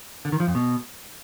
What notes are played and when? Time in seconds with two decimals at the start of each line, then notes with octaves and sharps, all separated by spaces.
0.25 D3
0.32 D#3
0.40 F3
0.47 F2
0.55 B2